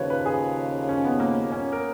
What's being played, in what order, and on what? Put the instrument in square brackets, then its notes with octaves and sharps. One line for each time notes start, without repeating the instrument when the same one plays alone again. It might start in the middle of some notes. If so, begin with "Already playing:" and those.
Already playing: [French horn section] D#2 C#3 F3 [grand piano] B4 C#5
[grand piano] B4
G#4
C#4
B3
A#3
C#4
A#4